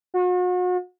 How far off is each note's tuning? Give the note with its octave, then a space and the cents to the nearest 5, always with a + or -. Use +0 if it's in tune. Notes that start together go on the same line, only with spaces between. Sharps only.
F#4 -40